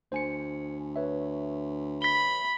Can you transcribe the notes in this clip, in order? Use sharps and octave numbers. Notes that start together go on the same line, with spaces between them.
D2 C5 G#5 C#7
B4 C#5 E5
B5 B6 G7